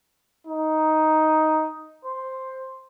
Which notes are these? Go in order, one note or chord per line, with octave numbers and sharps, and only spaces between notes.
D#4
C5